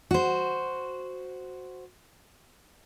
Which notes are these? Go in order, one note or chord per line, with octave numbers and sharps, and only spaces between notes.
F#4 C5